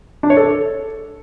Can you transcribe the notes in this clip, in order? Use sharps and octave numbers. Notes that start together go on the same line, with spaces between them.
D4
C#5
A4